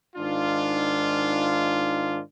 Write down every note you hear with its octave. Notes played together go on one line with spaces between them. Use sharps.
G#2 D#3 D4 F4